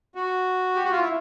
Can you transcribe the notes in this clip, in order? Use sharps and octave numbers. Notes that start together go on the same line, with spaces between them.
F#4
G4
F#4
F4
E4